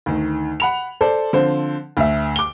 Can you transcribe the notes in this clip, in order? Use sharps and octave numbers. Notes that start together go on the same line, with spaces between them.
D2 D#3
F#5 B5 F7
A4 C5 D5
D3 F3 C4 C5
D2 E5
D6 G7